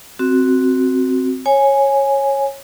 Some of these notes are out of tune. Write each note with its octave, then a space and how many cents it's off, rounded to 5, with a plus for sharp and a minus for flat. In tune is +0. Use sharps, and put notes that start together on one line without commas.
C4 +0 F#4 +0
C#5 -15 G#5 +0